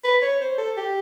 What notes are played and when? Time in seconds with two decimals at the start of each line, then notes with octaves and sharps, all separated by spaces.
0.04 B4
0.22 C#5
0.41 C5
0.58 A4
0.77 G4